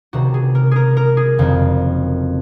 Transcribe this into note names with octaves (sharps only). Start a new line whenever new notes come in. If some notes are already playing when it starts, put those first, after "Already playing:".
C#2 C3 D#3 F#4
G#4
A#4
G#4 A#4
A#4
G#4
F#1 F2 D#3